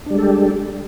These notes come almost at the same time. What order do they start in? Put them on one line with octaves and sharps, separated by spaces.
D4 G3 G#3 A4 G4